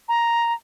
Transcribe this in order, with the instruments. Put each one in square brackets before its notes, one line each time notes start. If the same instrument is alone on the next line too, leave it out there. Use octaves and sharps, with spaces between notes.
[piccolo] A#5